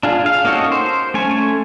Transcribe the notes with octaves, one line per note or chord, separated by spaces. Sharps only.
D4 F4 G#4
F5
A#3 C#4 D#4 F#4 A4
C5
A3 C#4 G#5